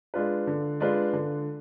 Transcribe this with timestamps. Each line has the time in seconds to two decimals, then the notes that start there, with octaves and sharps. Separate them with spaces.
0.14 G#3 D4 F4 B4
0.47 D3
0.80 G#3 D4 F4 B4
1.13 D3